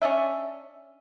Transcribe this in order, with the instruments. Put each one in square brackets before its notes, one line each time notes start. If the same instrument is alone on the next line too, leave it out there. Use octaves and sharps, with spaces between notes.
[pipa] C#4 D4 D#5 E5